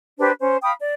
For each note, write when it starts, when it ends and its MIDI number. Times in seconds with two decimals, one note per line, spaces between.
0.19 0.31 62
0.19 0.31 67
0.19 0.31 71
0.19 0.31 72
0.39 0.56 61
0.39 0.56 72
0.62 0.72 77
0.62 0.72 79
0.62 0.72 83
0.62 0.72 87
0.78 0.94 74